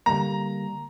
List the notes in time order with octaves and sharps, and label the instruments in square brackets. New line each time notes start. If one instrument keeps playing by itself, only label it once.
[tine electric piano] D3 G3 A#3 [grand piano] A#5